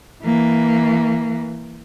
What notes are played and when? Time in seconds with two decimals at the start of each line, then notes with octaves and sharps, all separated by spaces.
0.24 E3 A#3